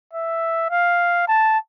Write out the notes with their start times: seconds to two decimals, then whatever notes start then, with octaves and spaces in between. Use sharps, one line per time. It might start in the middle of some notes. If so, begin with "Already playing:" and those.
0.13 E5
0.70 F5
1.28 A5